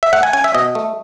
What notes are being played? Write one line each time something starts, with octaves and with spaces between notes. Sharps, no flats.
E5
A3 F#5
G#5
C#4 G#5
E5
B2 D#5
A3